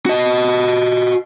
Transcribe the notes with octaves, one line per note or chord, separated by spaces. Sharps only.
F#4 D#5